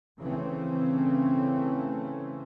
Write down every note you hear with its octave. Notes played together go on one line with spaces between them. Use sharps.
C#3 E3 A3 C4 C#4